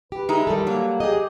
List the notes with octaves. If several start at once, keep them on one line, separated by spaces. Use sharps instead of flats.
G4 B4
G#3 D#4 E4
D#3 G3 A4
F#3 A#3
G4 G#4 D#5